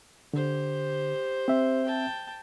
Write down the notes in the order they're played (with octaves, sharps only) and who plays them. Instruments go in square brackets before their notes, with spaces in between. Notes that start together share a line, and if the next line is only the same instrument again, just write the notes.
[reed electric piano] D3 [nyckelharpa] G4 C5
[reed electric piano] C4 E5
[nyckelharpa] G5 A5